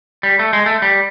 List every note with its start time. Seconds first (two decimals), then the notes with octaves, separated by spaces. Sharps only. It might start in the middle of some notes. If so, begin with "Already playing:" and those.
0.23 G3
0.39 A3
0.53 G#3
0.66 A3
0.82 G3